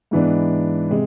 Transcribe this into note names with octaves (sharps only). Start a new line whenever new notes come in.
G#2 E3 B3 D4
C3 G#3